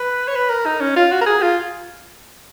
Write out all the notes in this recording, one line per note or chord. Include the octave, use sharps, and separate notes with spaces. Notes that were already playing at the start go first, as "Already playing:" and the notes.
Already playing: B4
C#5
B4
A#4
D#4
C#4
F4
F#4
A#4
G#4
F4